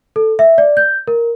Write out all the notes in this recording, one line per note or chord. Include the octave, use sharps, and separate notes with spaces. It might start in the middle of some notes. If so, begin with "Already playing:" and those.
A4
E5
D5
G6
A#4